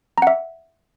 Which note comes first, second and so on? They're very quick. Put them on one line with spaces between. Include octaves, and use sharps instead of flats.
A#5 F#5 E5